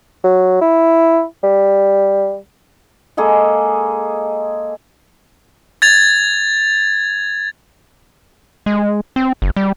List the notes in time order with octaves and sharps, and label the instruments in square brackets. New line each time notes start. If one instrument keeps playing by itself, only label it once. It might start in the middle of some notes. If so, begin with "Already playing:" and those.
[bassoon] F#3
E4
G3
[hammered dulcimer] G#3 A#3 G#4 A4
[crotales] G#6 A6 F7
[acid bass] G#3
C4
F#1
G3